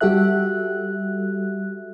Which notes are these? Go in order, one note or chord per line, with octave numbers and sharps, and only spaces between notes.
G3 F#4 G4 A4 E5 F#6